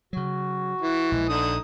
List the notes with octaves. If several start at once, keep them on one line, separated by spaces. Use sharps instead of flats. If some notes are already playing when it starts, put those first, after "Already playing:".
C#3 F#3 F#4
E3
A#1 G#3
D3 D#4 D#6